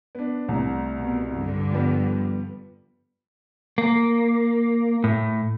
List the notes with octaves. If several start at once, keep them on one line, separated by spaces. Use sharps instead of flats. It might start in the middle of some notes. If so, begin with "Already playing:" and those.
B3 D4
C2 A2
B2
G2 D3
F3 G3 B3
A#3
A2